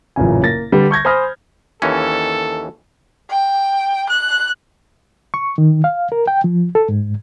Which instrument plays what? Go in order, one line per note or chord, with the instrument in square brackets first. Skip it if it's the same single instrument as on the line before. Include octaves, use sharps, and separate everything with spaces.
[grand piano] A1 F#2 A#2 C#3 G#5
A#3 A6 A#6
D3 G3 B4
C#6 G6 G#6 A#6
C5 G#5 B5 D#6 F6 A#6
[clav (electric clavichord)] D#2 E3 C#4 [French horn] A4
[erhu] G5
F#6
[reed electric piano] C#6
D#3
F5
A#4
G5
F3
A4
G#2